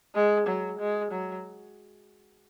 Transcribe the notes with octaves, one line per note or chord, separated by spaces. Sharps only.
G#3
F#3
G#3
F#3